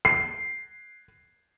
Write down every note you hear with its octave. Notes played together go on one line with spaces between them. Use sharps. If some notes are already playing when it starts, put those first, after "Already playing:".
C7